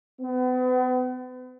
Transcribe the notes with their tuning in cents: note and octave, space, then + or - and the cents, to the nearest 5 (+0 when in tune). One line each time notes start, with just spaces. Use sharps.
B3 +40